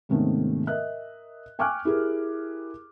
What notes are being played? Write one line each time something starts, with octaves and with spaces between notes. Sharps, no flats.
G#2 C3 D#3 A3 B3 C#4
A#4 D#5 E5 F#6
G5 G#5 C#6 D6 F6 F#6
E4 G4 G#4 A#4